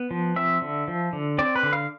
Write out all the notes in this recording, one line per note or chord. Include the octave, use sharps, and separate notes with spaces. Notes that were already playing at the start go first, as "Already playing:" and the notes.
Already playing: B3
F3
C4 E5
D3
F3
D3
C4 D5
B4
D3
F5